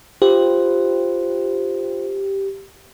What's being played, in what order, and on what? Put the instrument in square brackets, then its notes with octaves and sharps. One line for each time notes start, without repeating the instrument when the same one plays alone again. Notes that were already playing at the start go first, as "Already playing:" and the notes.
[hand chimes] F4 C5 [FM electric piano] G4